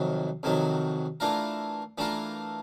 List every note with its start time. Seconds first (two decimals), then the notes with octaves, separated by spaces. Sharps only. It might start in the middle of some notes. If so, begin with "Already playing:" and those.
Already playing: F2 C3 D#3 F#3
0.43 F2 C3 D#3 F#3
1.20 E3 A3 D4 F4 A#4
1.98 E3 A3 D4 F4 A#4